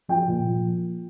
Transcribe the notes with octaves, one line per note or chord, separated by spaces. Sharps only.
F3 G5
A#2
F3